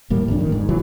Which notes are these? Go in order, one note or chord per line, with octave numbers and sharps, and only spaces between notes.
D#1 A2 G3 A#3
G1 F2 A#2 D4
D#3
G#2
F1 C#2 E3 F#3